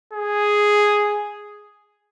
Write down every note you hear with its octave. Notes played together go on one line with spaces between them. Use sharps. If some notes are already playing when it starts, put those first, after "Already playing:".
G#4